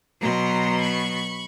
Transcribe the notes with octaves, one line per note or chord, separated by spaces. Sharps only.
B2 F#3 B3 A#5 C6
B5 C#6